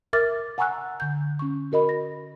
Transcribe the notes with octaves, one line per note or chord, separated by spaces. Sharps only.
A#4 E5 D6 F6 A6
F#5 G#5 A#5 C#6 E6 F#6
D3 G6
C#4 C#6
F#4 A#4 D#5 B5
A#6